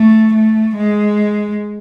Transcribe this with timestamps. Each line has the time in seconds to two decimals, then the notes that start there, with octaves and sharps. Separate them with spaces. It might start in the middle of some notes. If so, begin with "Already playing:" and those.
Already playing: A3
0.34 A3
0.76 G#3